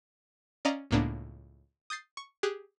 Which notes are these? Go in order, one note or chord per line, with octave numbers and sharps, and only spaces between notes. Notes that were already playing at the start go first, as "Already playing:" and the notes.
C#4 D5 D#5 F5 A#5
C#2 A2 A#3 B3 D4
D#6 G6 A6 C7
C#6
G4 G#4 F#6